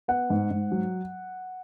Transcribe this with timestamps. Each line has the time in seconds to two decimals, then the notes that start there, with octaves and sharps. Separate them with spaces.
0.08 B3 F#5
0.30 G#2
0.51 G#2
0.72 F#3